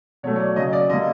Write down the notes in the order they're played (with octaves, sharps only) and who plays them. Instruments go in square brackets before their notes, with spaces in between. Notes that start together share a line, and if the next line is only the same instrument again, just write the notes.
[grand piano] B2 F#3 A3 C#5
C#5
D5
C#3 F#3 A#3 D#5
D5
D3 G3 A#3 D#5